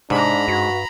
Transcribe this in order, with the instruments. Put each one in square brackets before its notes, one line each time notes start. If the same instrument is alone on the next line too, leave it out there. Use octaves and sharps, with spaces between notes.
[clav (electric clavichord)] G#2 [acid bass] C3 [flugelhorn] D4 [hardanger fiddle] A#5 B5
[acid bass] G2 [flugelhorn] F#4